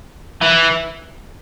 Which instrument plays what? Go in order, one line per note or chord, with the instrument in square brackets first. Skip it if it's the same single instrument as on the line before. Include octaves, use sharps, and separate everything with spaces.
[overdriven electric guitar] E3